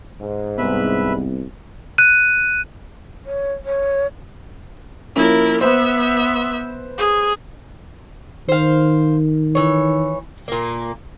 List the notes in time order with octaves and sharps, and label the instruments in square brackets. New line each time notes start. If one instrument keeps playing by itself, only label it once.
[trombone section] G#2
[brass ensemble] C2 [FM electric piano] B3 [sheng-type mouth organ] B4 E5 B5
[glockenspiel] F#6 D#7
[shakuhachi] C#5
C#5
[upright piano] F3 A#3 C#4 [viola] E4 A#4
[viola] B3 E5 [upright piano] B4 C5
[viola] G#4
[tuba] D#3 [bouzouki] C5 F5
[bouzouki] E3 C#5
A#2 A#3